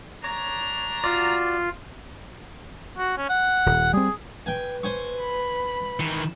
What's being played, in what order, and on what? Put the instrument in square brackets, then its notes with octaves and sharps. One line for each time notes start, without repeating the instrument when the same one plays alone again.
[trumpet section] D4 A#5 [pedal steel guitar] C#5
[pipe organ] F4 [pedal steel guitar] F#4 D5
[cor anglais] F#4
C#4
F#5
[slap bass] D#1
[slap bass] G3 C4 [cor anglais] G#4
[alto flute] B4 [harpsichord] G5 G#5
[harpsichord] C5 G#5 C#6
[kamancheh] B5
[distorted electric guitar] D#3 E3